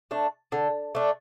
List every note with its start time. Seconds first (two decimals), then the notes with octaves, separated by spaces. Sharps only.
0.11 A3 D4
0.52 D3
0.95 A3 D4